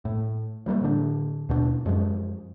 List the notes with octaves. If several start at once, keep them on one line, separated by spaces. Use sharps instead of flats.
A2
F3 G3 A#3
A2 D3 D4
D#2 B2 D4
F#2 F3 G#3